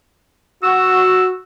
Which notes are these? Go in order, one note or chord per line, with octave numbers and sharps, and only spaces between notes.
F#4 E6